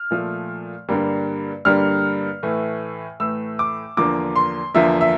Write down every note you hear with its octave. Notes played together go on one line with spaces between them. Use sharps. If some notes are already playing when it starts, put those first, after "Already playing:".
Already playing: F6
A#2 F3 A3
G2 D3 G3 A#3
G2 D3 G3 A#3 F6
A2 E3 A3
A2 E3 A3 E6
D6
E2 D3 F3 A#3 D6
C6
E2 D3 F3 A#3 E5
E5